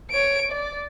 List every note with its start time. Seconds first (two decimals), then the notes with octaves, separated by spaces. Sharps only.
0.11 C#5 D7
0.51 D5